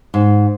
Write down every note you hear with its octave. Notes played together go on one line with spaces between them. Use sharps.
G#2